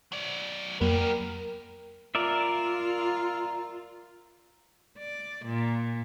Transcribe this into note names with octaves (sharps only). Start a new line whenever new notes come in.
F#3 D5
F2 F#3 A#3 B3 G4 A#4
F4 A#4 D5 E5
D5
A#2